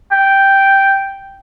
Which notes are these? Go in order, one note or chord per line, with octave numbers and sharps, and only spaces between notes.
G5